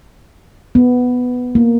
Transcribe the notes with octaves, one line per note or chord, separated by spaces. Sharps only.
B3
A#3